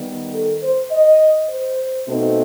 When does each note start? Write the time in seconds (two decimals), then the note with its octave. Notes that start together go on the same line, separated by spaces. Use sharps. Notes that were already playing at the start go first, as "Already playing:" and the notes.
Already playing: D#3 G3 B3
0.33 A4
0.63 C5
0.92 D#5
1.49 C5
2.08 B2 A3 C4 D#4